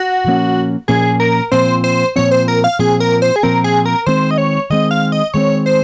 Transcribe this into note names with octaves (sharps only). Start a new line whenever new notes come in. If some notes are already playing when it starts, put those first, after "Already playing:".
Already playing: F#4
A#2 F3 A#3 C#4
A#2 F3 A#3 C#4 G#4
A#4
A#2 F3 C4 C5
C5
A#2 F3 C4 C#5
C5
A#4
F5
A#2 F3 C4 G#4
A#4
C5
G#4
A#2 F3 C4 A#4
G#4
A#4
D#3 G#3 C4 C5
D#5
C#5
D#3 G#3 C4 D#5
F5
D#5
D#3 G#3 C4 C#5
C5